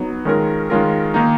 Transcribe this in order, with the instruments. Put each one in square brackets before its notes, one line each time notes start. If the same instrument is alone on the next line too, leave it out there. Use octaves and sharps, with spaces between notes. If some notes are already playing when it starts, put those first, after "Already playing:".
Already playing: [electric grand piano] F#3 B3 D#4
D#3 G#3 C#4 F4 A#4
D#3 G#3 C#4 F4 A#4
D#3 A#3 D#4